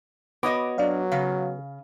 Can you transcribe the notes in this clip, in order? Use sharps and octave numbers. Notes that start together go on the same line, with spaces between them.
B3 F#4 C#5 D#5 D6
F#3 D4 D5 F5
C#3 F5